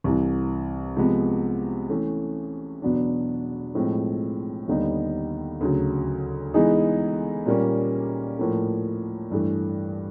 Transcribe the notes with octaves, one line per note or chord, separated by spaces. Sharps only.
C2 C3 E3
C3 F3 G#3 B3
E3 A3 C#4
E2 B2 F#3 B3 D4
A2 F3 G#3 C4
D#2 D3 G3 B3 D#4
D2 C#3 F#3
E3 G#3 B3 D#4 G#4
A#2 G3 A#3 C#4
A2 F3 A#3
G2 E3 A3